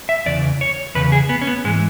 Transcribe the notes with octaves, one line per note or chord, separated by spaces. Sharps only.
E5
E2 C#3 E3 D5
C#5
E2 C#3 B4
G#4
B3
C#4
B3
G#2 E3 G#3